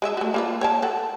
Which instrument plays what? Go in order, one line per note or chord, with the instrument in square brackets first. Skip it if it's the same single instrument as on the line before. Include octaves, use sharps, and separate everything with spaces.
[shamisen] G#3 D#5 E5
A3 F#4
A#3 F4 B4
C#5 G5 A5
A4 F#5